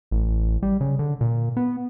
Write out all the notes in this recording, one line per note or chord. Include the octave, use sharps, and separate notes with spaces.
A1
G3
C#3
D3
A#2
B3